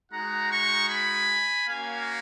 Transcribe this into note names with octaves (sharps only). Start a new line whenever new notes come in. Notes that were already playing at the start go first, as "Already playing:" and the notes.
G#3 D#4 F#4 F#5 A#5
A#5 C#6
G#5 B5
A#3 C#4 F#4 F5 G#5